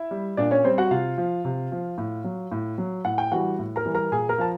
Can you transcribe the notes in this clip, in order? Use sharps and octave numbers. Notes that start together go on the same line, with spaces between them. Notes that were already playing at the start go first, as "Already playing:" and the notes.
Already playing: E4 E5
G3
A#2 D4 D5
C#4 C#5
G3 C4 C5
F#4 F#5
C3 F4 F5
F3
C3
F3
A2
F#3
A2
F#3
A2 F#5
G5
E3 G3 F#4 F#5
A2
A#4 A#5
E3 G3
A#4 A#5
A#2 G#4 G#5
A#4 A#5
F3 A5